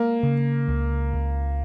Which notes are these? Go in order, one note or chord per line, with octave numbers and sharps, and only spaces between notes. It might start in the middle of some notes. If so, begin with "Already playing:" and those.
Already playing: G#3 A#3
C#3
C#2
C#2